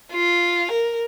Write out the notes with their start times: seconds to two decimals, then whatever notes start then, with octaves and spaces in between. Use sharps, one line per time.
0.12 F4
0.71 A#4